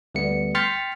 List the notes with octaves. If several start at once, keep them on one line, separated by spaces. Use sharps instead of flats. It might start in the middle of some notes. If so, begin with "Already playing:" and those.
D2 G3 A3 B3 C#7
G5 C6 F6 A6 B6 C#7